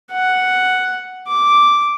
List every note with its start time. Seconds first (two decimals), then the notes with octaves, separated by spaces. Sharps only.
0.12 F#5
1.27 D6